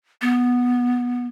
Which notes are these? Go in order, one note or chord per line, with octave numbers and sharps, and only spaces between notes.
B3